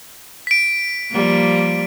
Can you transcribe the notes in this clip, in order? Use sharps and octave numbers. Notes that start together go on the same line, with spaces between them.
B6 D7
F3 G3 A#3